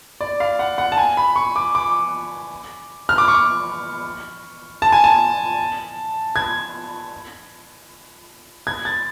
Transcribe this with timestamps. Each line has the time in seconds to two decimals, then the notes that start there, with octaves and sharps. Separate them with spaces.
0.21 D5
0.40 F5
0.59 F#5
0.78 F#5
0.92 A5
0.98 G#5
1.17 B5
1.36 C#6
1.56 D6
1.75 D6
3.09 F6
3.18 D6
3.28 C#6
4.82 A5
4.92 G#5
5.04 A5
6.36 G#6
8.67 G#6
8.85 A6